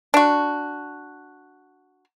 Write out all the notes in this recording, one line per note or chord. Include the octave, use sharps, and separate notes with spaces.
D4 F#4